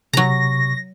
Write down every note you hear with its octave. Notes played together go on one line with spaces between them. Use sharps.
C3 F#3 A#5 C#6 A#6